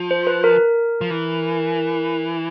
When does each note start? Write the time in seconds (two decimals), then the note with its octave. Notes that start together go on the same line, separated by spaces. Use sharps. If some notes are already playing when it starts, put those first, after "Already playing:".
Already playing: F3
0.11 C5
0.27 B4
0.44 A#4
1.01 F3
1.10 E3